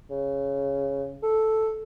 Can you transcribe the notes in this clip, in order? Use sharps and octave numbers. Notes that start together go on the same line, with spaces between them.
C#3
A4